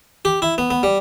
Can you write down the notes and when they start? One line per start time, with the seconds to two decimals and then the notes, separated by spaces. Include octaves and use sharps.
0.25 G4
0.42 E4
0.58 B3
0.71 B3
0.83 G3